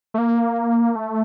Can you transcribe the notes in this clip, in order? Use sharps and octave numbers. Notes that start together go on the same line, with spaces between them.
A3
A#3
A3